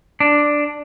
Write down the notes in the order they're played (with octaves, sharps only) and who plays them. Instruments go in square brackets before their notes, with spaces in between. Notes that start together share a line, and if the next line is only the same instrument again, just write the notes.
[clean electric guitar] D4